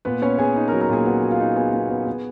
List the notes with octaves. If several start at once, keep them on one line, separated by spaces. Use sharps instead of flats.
A#2 B3 B4
B3 C#4 C#5
B3 G#4 G#5
D#4
F#3 A#4 A#5
A#4 A#5
A#2 G#4 G#5
B3 F#4 F#5
F#3
F4 F5
D#4
B3 G#4 G#5
B3
B3
B3